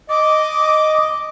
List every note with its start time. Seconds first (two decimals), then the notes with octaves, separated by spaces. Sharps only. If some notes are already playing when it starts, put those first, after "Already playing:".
0.09 D#5 D6